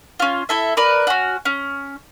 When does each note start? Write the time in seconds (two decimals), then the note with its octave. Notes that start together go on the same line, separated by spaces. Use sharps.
0.20 C#4 F4
0.49 E4 A4 E5
0.77 A#4 B4 D5
1.07 C#4 F#4
1.45 C#4